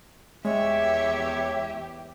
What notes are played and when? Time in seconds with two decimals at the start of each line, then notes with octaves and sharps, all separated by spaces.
0.45 E2 G#3 G4 C#5 E5